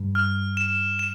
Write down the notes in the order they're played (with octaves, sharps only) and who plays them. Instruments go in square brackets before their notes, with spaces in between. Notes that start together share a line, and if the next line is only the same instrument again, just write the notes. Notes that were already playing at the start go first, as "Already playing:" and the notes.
Already playing: [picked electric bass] G2
[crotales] F6
E7
E7